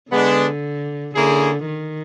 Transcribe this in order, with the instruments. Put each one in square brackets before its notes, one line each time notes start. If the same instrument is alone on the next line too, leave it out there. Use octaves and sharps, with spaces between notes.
[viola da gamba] D3 [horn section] G#3 B3 D4
[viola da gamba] D3 [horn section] A#3 C#4 E4 G#4
[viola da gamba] D#3